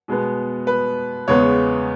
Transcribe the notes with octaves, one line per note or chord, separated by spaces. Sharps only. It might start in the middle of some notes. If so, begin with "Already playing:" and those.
B2 G#3 B3
B4
E2 C#3 G#3 B3 C#5